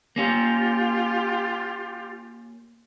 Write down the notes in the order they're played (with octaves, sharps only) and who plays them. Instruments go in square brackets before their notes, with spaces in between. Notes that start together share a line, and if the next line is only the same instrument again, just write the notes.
[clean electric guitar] A#3 C#4 [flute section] F4 G4